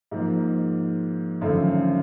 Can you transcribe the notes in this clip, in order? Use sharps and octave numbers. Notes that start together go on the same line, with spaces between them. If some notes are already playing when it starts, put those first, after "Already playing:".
G#2 F3 A#3
G#1 F#2 D3 F3 A3